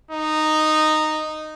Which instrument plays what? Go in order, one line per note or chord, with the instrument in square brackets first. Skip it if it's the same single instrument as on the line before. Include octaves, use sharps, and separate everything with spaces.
[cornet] D#4